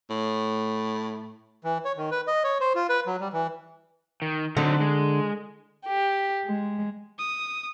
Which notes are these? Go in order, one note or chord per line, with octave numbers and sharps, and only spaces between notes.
A2
E3
C#5
D#3
B4
D#5
C#5
C5
F4
B4
F#3
G3
E3
D#3
D3 F#3 C4 D#4
G#3
G4
G#3
D#6